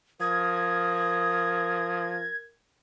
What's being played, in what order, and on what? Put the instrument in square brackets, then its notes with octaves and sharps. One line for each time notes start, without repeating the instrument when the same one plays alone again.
[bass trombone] F3 [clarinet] A#4 [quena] D#6 [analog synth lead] G#6